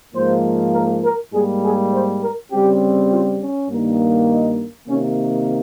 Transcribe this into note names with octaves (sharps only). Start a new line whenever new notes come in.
G#2 F3 A#3 C5
A#4
A#4
G#2 G3 A#3 G#4
G#4
C5
A#4
C#3 G3 C4 G4
F4
C#4
G2 D#3 A#3
D#4
C3 D#3 A#3 C#4